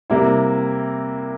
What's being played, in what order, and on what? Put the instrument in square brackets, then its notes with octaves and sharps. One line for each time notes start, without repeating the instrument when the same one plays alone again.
[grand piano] C3 G3 A#3 E4